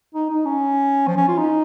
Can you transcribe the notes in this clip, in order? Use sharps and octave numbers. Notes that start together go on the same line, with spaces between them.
D#4
D#4
C#4
F3
C#4
F4
D#4